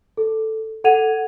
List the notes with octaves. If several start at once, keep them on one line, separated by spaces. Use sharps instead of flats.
A4
A4 F#5 G#6 D#7 F7